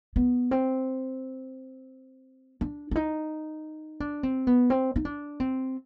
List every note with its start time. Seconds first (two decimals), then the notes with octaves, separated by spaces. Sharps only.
0.16 B3
0.51 C4
2.61 D4
2.91 D4
2.96 D#4
4.00 D4
4.23 C4
4.47 B3
4.70 C4
4.96 D#4
5.05 D4
5.40 C4